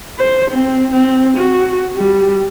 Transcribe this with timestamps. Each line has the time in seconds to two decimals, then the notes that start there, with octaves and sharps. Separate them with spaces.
0.19 C5
0.51 C4
0.92 C4
1.38 F#4
1.96 G3